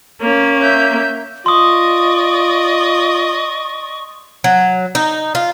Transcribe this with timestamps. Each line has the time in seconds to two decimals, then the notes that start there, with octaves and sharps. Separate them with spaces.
0.22 A#3 C#4
0.62 E5 G6
1.46 F4 D5 D#5 C6 C#6 D#6
4.44 F#3
4.95 D#4
5.35 F4